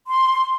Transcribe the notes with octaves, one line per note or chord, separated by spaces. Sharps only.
C6